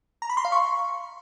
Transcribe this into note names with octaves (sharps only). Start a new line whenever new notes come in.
A#5
B5
C6
F5
C#6